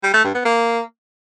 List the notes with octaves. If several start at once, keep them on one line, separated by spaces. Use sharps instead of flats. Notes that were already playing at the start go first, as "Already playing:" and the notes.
G3
A3
G2
B3
A#3